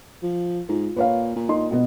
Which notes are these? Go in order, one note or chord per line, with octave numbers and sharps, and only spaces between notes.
F3
G#2 F4
A#2 B4 C#5 F5
A#2
D#4 C6
B2 B3